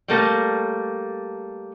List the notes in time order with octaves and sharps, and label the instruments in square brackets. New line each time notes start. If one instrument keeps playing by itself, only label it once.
[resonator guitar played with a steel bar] G3 A3 A#3